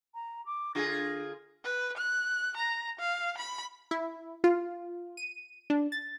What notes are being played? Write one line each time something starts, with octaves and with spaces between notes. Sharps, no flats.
A#5
D6
D3 F4 G#4 A#6
B4
F#6
A#5
F5
B5
E4
F4
D#7
D4
A6